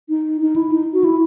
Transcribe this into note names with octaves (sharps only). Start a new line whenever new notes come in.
D#4
D#4
E4
D#4
F#4
E4